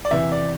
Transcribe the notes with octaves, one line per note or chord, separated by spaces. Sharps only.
D5
E2 C3 E3 E5
D5